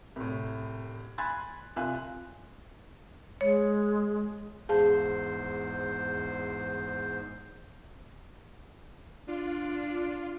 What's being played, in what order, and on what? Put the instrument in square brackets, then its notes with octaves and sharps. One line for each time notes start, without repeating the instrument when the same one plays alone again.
[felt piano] C2 A2
G#5 B5 C6 F#6 G#6 A6
C2 F4 E5 F5 G#5 F#6
[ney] G#3 [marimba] C#5
[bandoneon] E2 G#2 [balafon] G#4 F5 A5 [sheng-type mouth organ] C5
[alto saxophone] D4 [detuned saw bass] F4